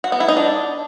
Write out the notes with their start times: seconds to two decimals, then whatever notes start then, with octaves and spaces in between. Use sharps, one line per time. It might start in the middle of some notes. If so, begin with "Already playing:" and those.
0.04 F#4
0.12 B3
0.20 E4
0.28 D#4
0.37 D4